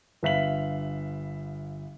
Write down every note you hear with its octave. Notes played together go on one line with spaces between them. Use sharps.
G1 B4 E5 F5 B6 F#7